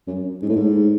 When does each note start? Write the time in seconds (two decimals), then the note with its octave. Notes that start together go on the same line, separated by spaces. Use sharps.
0.07 F#2
0.42 G#2
0.49 A2
0.56 G#2